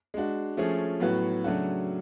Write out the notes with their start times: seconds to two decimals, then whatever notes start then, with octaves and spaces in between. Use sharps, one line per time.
0.14 G#3 D4 F#4
0.57 F3 A3 C#4 G#4
1.00 A2 F#3 B3 F#4
1.44 C#3 F#3 A3 D4 F#4